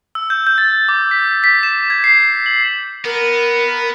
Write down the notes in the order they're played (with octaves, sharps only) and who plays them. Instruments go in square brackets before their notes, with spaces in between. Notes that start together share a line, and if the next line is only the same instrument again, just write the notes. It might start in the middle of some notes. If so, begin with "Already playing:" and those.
[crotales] E6
G6
G6
A6
D6
B6
B6
E7
G#6
C7
F#7
[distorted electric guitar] B3 [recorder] A#4